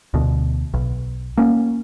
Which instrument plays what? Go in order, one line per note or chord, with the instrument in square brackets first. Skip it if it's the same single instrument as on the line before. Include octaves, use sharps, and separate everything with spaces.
[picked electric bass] D2 B2
B1
A#3 C#4